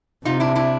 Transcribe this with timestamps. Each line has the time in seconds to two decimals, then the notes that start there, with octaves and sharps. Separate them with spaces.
0.25 C3 D#4 F4
0.40 D4 E4
0.55 D4 E4